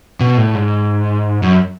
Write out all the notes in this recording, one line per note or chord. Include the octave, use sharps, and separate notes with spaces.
B2
A2
G#2
F#2